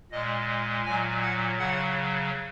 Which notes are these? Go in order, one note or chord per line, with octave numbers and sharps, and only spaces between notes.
A#2 G#3 D#5
A#2 F#3 G#5
F#5
C#3 F#3 F#5